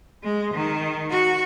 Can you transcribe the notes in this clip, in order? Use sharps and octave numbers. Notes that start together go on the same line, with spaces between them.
G#3
D#3
F#4